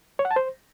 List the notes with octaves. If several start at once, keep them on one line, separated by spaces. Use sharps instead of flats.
C#5
F#5
A5
C5